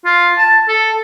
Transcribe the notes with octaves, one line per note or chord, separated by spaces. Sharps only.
F4
A5
A4